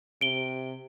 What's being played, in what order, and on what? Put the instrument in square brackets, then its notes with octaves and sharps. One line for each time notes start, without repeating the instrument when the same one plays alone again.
[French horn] C3 [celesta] D7 G7